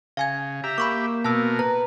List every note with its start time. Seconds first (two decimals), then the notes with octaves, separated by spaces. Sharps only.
0.17 C#3 F5 G#5 G#6
0.64 G4 E5 A#5
0.78 A#3 B5 C#6 D6
1.24 B2 A#4 A5 E6
1.59 B4 A#5